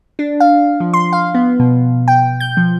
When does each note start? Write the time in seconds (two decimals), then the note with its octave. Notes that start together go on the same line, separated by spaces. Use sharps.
0.19 D4
0.40 F5
0.80 F3
0.93 C6
1.13 F5
1.34 B3
1.60 B2
2.08 G5
2.40 G6
2.57 F3